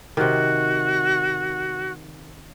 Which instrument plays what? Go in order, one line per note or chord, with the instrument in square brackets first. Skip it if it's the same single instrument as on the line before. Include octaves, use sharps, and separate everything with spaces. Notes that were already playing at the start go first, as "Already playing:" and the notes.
[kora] C3 D#3 [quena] F#4